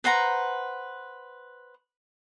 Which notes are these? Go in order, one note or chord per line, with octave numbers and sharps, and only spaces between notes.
B4 C5 F#5 A#5